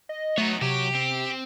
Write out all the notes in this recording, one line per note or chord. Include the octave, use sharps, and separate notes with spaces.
D#5
F#3 A3 B3 D#4 C#5
C3 F#3 F#4 G4
C4